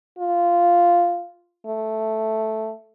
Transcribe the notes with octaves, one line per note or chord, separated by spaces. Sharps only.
F4
A3